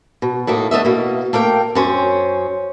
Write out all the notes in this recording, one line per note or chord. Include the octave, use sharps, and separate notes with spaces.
B2
A2 A3 A#3 D#4
D3 A3 D#5 E5
B2 A#3
A3 A#3 A#4 G5
F#2 C#4 C5